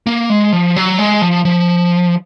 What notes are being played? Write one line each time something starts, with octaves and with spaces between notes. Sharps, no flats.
A#3
G#3
F3
F#3
G#3
F3
F3